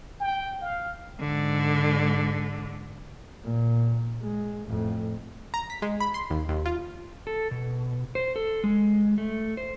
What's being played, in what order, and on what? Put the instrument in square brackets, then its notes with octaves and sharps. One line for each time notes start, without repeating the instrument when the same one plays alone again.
[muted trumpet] G5
F5
[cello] G#2 D3
[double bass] A#2
G#3
F2 A2
[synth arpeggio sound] A#5
B6
G#3
B5
C6
D#2
D#2
F4
[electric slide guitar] A4
B2
C5
A4
G#3
A3
C5